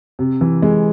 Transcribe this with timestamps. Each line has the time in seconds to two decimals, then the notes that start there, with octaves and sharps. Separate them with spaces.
0.19 C3
0.41 E3
0.62 G#3